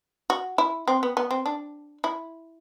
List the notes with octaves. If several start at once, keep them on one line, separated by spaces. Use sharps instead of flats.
F#4
E4
C4
B3
B3
C4
D4
E4